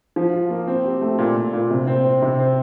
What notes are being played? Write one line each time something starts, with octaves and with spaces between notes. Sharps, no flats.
F3
F4
A#3
C4
G4
A3
A#2
A#2
A#2
C3
C4
C4
C3
C4